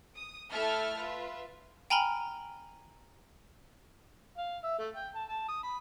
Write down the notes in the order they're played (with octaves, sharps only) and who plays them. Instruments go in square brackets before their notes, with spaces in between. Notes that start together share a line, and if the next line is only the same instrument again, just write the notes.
[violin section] D#6
A3 E4 A4 E5 A5 F6
F4 B4 E5
[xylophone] G5 G#5 A#5 B5 F6 G7
[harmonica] F5
E5
A3
G5
A5
A5
D#6
B5